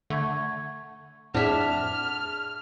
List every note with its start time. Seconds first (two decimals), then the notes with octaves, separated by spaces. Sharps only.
0.10 D3 A3 F#5 C#6 G#6
1.34 F2 A2 D4 G#4 E5 F#5 F6